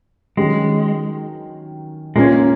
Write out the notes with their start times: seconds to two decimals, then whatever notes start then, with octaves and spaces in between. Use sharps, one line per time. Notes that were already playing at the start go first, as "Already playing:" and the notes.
0.37 D#3 F#3 G#3 C#4
2.15 A#2 G#3 A#3 C#4